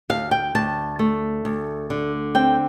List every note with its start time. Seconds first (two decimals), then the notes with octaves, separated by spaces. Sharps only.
0.10 D2 F5
0.31 G5
0.55 D2 A5
0.99 A3
1.45 D2
1.90 D3
2.35 C4 G5